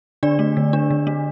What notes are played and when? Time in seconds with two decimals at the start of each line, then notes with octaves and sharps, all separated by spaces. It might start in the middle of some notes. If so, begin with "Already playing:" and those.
0.23 D3 D4 D5
0.39 A3
0.57 D3
0.73 D4
0.91 D3
1.07 A3